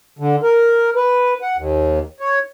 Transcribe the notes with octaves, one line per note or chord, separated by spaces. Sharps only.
D3
A#4
B4
F#5
D#2
C#5